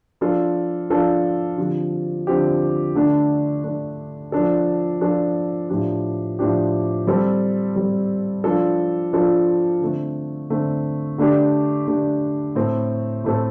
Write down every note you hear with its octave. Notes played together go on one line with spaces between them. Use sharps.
F3 D4 F4 A4
F3 D4 F4 A4
D3 F3 C4 G4
D3 F3 C4 G4
D3 A3 D4
D3 A3 D4
F3 D4 A4
F3 D4 A4
A2 F3 D4 G4
A2 F3 D4 G4
G3 C4 A4
G3 C4 A4
F3 D4 F4 A4
F3 D4 F4 A4
D3 A3 C4
D3 A3 C4
D3 A3 D4 G4
D3 A3 D4 G4
A2 A3 C4 A4
A2 A3 C4 A4